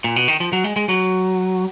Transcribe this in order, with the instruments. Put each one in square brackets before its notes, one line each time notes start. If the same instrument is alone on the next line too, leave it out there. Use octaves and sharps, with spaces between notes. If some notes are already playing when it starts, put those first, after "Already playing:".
[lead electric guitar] A#2
B2
D#3
F3
F#3
G#3
G#3
F#3